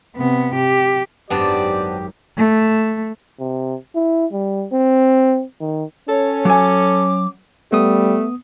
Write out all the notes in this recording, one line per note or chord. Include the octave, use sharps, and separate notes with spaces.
C3 B3
G4
G#1 F#2 B3 C4 D4 G4 D5
A3
C3
E4
G3
C4
D#3
C#4 A4 C#5
F#3 G#5 D6
G3 A3 B3 D#6